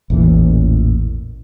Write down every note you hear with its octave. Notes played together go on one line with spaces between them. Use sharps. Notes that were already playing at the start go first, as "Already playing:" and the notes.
A1 E2 A#2 E3